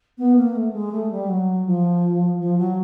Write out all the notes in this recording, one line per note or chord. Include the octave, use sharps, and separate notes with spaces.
B3
A#3
A3
G#3
A3
G3
F#3
F3
F3
F#3